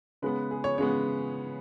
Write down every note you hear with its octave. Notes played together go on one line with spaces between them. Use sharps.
C#3 G#3 B3 B4
G#4
C#5
C#3 G#3 B3 C#5